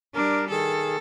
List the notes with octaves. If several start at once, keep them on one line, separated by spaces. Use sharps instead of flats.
G3 D4 A#4
D#3 G#4 A4